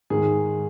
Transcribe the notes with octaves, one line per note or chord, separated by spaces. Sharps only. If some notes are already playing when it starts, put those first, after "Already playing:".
G#2 D#3 G#3 G#4